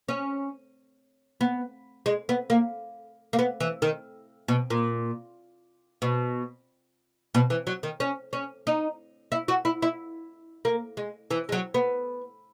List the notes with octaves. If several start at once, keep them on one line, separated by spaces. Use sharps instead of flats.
C#4
B3
G#3
B3
A#3
A#3
B3
E3
D#3
B2
A#2
B2
B2
E3
F#3
D#3
C#4
C#4
D#4
E4
F#4
E4
E4
A#3
G#3
E3
G#3
F#3
B3